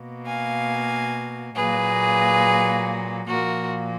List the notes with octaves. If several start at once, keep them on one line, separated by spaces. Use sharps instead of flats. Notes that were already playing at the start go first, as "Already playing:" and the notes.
Already playing: B2 A#3
F5 G#5
A#2 F#3 A#3 G#4 B4
A#2 F3 A#3 F#4 A#4